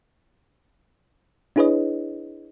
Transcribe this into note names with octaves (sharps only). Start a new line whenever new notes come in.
D4 E4 G#4 B4 C#5 D#5